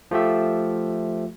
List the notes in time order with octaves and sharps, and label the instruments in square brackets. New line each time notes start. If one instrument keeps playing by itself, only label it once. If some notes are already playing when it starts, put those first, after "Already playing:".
[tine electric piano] F3 A3 G4 E5